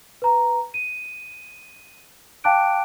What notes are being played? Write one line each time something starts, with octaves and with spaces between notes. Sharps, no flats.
B4 A#5
D#7
F5 G5 A5 D6 F#6 D7